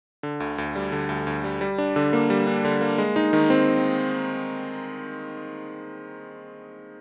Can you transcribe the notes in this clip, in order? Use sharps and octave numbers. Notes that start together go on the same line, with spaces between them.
D3
D2
D2
G3
D3
D2
D2
G3
G3
D4
D3
A#3
G3
D4
D3
A#3
G#3
D#4
D#3
C4